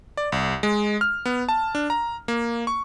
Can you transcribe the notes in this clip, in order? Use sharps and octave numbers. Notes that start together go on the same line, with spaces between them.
D5
C2
G#3
F6
B3
A5
D4
A#5
A#3
C#6